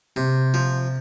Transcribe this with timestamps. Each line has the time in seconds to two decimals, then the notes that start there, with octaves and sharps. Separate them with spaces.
0.16 C3
0.54 F3